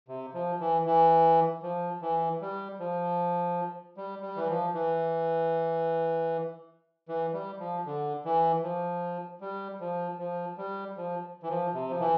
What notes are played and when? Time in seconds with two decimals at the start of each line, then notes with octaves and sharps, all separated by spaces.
0.08 C3
0.34 F3
0.60 E3
0.86 E3
1.63 F3
2.02 E3
2.41 G3
2.79 F3
3.97 G3
4.22 G3
4.36 E3
4.48 F3
4.74 E3
7.08 E3
7.33 G3
7.59 F3
7.86 D3
8.25 E3
8.63 F3
9.41 G3
9.80 F3
10.18 F3
10.57 G3
10.97 F3
11.43 E3
11.49 F3
11.74 C3
11.89 F3
12.00 E3